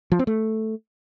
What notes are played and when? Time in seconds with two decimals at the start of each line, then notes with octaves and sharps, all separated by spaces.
0.12 F3
0.19 C4
0.27 A3